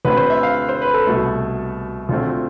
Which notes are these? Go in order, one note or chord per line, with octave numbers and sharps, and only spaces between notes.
D2 D3 A3 C4 B4
C5
E5
F5
C5
B4
A4
C2 B2 A3
D2 D3 A3 C4 F4